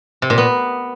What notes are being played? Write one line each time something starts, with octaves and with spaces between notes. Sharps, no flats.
C3
A#2
B3